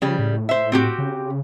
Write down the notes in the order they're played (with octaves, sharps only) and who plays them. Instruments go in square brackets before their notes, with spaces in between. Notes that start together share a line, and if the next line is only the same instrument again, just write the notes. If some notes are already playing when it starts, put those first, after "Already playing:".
[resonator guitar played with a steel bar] C#3 G3 [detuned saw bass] F3
[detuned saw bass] A2
[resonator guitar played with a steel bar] C5 E5
C4 F#4 G4
[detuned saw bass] C#3